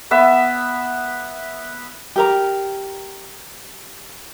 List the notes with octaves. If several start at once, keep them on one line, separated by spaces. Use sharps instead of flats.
B3 E5
G4 A#4 A#5